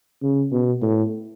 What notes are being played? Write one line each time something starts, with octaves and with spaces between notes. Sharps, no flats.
C#3
B2
A2